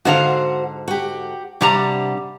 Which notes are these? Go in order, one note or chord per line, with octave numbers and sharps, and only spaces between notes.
G#2 D3 F#4 C5 F5 F#5
F#4 G4
G2 C3 G3 D4 F#5 A#5